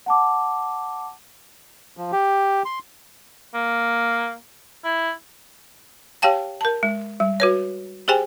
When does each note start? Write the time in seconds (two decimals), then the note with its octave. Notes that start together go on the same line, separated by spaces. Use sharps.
0.06 F#5 A5 D6
1.97 F3
2.12 G4
2.65 C6
3.54 A#3
4.84 E4
6.22 G4 C#5 F5 G5 A5
6.61 A#4 A5
6.83 G#3
7.20 G3
7.40 F#4 B4 C#5
8.08 G4 G#4 C5 G5 G#5